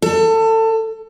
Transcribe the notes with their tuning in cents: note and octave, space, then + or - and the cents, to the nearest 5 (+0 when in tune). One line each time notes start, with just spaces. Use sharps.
A4 +25